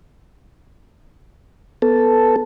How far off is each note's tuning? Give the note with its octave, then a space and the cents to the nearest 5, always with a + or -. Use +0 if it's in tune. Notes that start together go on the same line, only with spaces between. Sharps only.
B3 +0 A4 +0